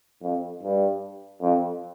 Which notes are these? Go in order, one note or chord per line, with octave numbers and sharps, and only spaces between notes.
F2
G2
F2